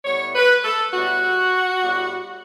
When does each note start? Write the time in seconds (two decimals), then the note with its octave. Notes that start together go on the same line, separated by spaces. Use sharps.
0.05 A2 G3 B3 C#5
0.36 B4
0.65 A4
0.94 A2 G3 B3 F#4
1.82 A2 G3 B3